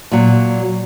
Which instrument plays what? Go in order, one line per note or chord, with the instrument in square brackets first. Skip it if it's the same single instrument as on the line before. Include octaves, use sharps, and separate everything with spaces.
[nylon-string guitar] A#2 F#3